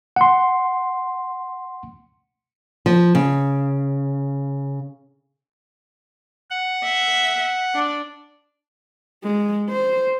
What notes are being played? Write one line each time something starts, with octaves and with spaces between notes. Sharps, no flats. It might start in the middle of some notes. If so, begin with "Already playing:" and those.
F#5 C6
F3
C#3
F#5
E5
D4 D5
G#3
C5